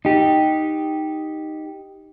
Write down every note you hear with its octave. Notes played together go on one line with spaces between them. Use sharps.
D#4 G4